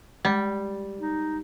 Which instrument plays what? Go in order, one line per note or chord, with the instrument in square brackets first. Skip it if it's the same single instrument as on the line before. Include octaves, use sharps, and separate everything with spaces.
[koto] G3 [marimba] G#3
[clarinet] D#4